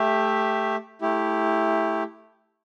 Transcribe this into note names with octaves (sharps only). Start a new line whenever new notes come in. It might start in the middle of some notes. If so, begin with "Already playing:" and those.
Already playing: A3 G4 E5
A3 E4 G4